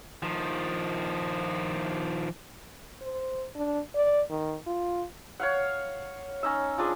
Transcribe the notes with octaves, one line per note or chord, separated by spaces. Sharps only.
D#3 F3
C5
D4
D5
D#3
F4
C#5 F5 F#5
C#4 D#4 E5
F3 D4 G#4